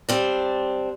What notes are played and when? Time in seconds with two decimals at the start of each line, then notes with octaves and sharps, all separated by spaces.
0.09 G3 C4 D4